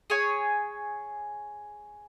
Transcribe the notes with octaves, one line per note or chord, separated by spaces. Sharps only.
G#4 C#5 G#5